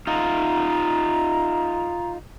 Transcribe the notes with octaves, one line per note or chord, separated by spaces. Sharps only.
D#4 F4 A#5